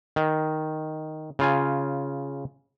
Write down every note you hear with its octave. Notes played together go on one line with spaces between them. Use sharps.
D#3
C#3 F4 G#5